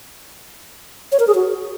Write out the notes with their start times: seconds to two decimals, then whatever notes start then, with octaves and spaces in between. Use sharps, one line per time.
1.12 C#5
1.20 A#4
1.27 G#4
1.35 F#4